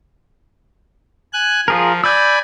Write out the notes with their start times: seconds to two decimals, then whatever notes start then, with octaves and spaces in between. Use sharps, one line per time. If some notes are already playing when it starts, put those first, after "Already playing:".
1.33 G#5 F#6
1.68 F3 F4 G#4 A#4
2.04 D5 G#5 B5 E6 G6